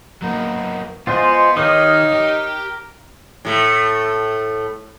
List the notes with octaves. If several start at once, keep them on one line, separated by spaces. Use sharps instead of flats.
F#3 A#3 B3 D#4
G#3 B3 F4 C5 D#5
D#3 D#4 G4 C#5 D#5 F5 D#6
G4 A#4
A2 A3